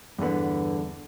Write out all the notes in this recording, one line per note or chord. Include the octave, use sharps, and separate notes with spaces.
E2 G2 D3 B3